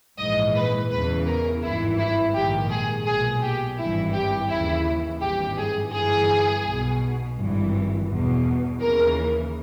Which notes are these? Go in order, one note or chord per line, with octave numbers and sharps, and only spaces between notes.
A#1 G#2 E3 D#5
B4
E2 C#3 E3 B4
A#4
G#1 G2 E3 E4
E4
A#1 G#2 D#3 G4
G#4
B1 A#2 G#4
G4
G#1 G2 E3 E4
G4
D#2 C#3 E3 E4
G#1 G2 E3 G4
G#4
G1 G2 E3 G#4
B1 B2
G#1 G2 E3
E2 B2
D#2 C#3 E3 A#4